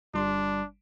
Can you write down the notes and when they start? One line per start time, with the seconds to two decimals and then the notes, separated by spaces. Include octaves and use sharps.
0.14 G1 G3 D4 C6